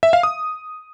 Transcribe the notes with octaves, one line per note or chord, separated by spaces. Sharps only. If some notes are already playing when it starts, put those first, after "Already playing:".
E5
F5
D#6